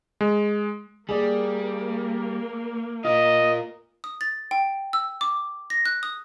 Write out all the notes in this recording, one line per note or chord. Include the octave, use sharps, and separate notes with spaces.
G#3
G3 A#3 G#4 D5
F4 A#4 D#5
D#6
A6
G5
E6
D6
A#6
F#6
D#6